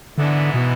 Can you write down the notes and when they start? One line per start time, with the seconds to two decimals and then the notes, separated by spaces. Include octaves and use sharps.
0.17 G#2 D3 E3 B3 E4
0.54 B2